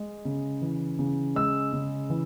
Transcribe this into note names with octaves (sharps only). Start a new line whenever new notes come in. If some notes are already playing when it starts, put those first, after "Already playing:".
Already playing: G#3
C#3
E3
C#3
G#3 E6
C#3
E3